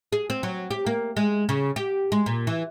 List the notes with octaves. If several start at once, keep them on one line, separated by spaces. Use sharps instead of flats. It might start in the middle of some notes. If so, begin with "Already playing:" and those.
G#4
C4
F#3
G4
A#3
G#3
C#3
G4
G#3
A#2
E3